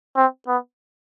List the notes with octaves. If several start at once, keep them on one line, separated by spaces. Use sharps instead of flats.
C4
B3